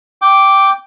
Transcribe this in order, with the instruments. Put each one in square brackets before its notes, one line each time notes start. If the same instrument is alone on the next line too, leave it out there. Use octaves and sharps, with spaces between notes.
[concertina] G5 D6